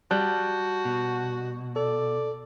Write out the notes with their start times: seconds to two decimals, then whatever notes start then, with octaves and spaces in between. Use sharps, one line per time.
0.11 G3 F#4 A5 F#6 G6
0.85 B2
1.76 A4 D5